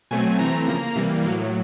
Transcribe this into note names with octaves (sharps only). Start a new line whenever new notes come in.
B2 F#3 A3 C4 G#5
C3 E3 A3 C4 A#5
C#3 F3 A#3
C3 E3 G3 A#3
A2 F#3 A#3